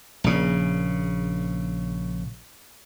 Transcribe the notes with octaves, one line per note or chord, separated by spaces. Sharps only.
A#1 C#3